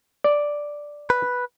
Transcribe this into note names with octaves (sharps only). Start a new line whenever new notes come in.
D5
B4